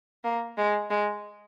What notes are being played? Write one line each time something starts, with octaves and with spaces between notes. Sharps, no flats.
A#3
G#3
G#3